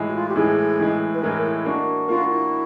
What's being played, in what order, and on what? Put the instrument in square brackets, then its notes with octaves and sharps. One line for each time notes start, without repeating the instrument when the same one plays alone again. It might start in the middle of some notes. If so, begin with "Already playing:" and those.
Already playing: [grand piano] A2 E3 G#3
[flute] F#4
F4
G4
[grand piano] A2 E3 G#3 [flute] G#4
[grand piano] A2 E3 G#3
[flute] B4
[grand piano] A2 E3 G#3 [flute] A#4
[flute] E4
[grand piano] A#3 D4 F#4
[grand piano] A#3 D4 F#4 [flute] F4
[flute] E4